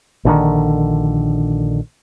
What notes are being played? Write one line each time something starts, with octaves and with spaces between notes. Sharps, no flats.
A#1 D3 D#3